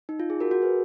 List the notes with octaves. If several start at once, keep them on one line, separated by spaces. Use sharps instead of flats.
D#4
F4
G#4
F#4 A#4
F#4 A#4
G#4 B4